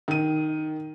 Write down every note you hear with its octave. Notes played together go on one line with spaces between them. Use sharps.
D#3 D#7